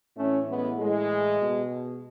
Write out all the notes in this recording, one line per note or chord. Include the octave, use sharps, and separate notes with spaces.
A2 E3 A3 C#4
G#3 B3
A2 E3 G#3
B2